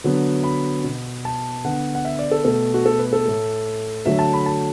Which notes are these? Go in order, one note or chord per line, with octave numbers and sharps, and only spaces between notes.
D3 F#3 B3
B5
B2 B3
A5
D3 B3 F#5
F#5
E5
D5
A4
B2 A3 A4
F#4
A4
B4
A4
A2 A3
D3 F#3 A3 E5
A5
B5
A5